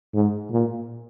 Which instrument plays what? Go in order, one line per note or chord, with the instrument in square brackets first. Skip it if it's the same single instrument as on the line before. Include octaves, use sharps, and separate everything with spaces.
[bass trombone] G#2
A#2